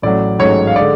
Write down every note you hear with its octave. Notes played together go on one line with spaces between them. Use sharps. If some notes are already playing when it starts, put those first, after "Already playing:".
A1 A2 F#3 D5
A1 G#2 F#3 A3 C#5
F5
D3 G#3 D5